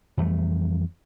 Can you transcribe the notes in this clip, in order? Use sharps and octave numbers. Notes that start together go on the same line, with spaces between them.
F2 E3 G3 A3